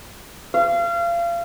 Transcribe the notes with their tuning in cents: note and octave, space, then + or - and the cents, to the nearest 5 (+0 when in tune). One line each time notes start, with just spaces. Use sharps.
F5 -30